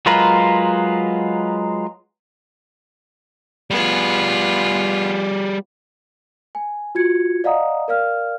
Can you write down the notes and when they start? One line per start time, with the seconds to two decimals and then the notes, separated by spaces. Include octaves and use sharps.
0.06 F#3 G#3 F4 A#4 B4
3.71 G3 B3 F4 G#4
6.55 G#5
6.95 F4 F#4 G#6 C#7
7.44 D5 D#5 F5 F#5 A#5 D#6
7.88 A#4 D5 F5 F6